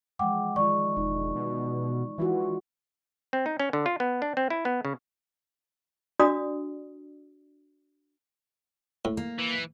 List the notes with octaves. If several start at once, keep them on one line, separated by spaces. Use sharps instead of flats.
E3 F3 G#3 F#5 G5 D6
D#3 G#3 F4 D5 C#6
E1 D#4
B2
E3 G#3 F4 F#4
C4
D#4
C#4
D3
F4
B3
D4
C4
E4
B3
C#3
D4 F#4 D5 D#6
A2
A#3
E3